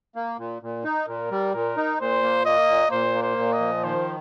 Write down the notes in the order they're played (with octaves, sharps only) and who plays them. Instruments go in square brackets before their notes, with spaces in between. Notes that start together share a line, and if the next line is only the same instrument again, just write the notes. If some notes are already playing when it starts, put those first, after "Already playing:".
[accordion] A#3
A#2
A#2
D#4
[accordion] A#2 [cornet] A#4
[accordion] G3
[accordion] A#2 [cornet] A#4
[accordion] D#4
[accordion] A#2 [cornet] C5
[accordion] A#3
[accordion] A#3 [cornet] D#5
[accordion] A#2
[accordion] A#2 [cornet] C5
[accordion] A#3
[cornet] C5
[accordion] A#2
[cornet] D#5
[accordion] F3
[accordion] D#3 [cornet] C5